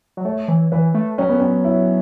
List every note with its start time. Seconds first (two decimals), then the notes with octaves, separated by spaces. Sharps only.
0.17 F#3
0.25 A3 C#5
0.48 E3
0.72 E3 B4
0.94 A3
1.18 F#3 C#4
1.29 B3
1.40 C#4
1.64 E4